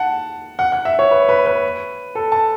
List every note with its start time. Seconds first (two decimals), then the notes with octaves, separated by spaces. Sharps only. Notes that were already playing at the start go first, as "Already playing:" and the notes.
Already playing: F#5 A5
0.59 F#5
0.72 F#5
0.85 E5
0.99 C#5
1.11 B4
1.29 B4
1.46 B4
2.15 A4
2.32 A5